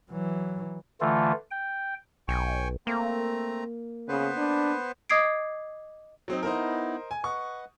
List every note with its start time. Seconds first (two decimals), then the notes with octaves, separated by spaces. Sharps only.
0.11 E3 F#3
1.01 D3 E3 A3 F4
1.51 G5
2.28 B1 G5 G#5 C#6
2.87 A3 A#3 C4 A#5
4.08 C#3 B3 B4 C5
4.37 D4
5.10 D#5 D6 D#6 G#6 C7 D7
6.28 F#3 C4 D#4
6.43 B3 D#4 E4 A#4 C5 D#5
7.11 G#5
7.24 B4 D#5 F#5 C#6